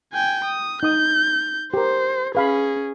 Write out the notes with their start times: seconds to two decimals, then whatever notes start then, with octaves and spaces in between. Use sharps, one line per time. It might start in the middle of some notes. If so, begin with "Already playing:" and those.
0.13 G5 G#5
0.45 D#6
0.83 D#4 D#6 G6
1.74 G4 A#4 C5
2.35 C#4 G#4 B4 F5 B5